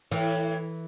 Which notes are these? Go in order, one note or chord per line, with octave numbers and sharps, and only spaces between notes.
A2 E3